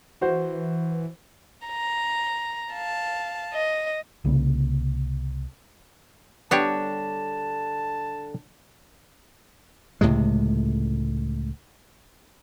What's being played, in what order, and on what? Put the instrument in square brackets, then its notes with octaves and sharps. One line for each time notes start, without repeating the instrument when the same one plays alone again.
[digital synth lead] E3 [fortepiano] F#4 C5
[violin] A#5
F5 A5
D#5
[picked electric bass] C2 C#3 A#3
[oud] D3 G3 [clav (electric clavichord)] B3 G4 [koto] D4 C#5 [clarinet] A5
[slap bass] C#2 A2 C3 G#3